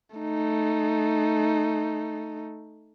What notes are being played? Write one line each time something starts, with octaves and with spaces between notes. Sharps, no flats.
A3 D#4